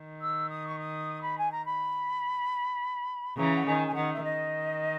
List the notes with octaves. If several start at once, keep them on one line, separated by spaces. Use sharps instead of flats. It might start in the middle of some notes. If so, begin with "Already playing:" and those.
Already playing: D#3
E6
D#6
C#6
D#6
B5
G#5
A#5
B5
C#3 E3 A#5
F#5
D#3 G#5
G#5
D#3 F#5
E5
D#3 D#5